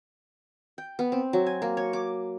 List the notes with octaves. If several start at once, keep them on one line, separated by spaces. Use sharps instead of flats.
G5
B3
C4
F#3
G#5
A#3
C#5
D6